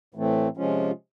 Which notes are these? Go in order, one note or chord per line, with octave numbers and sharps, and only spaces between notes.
A2 E3 A3 C4
C3 F3 G#3 C#4 F4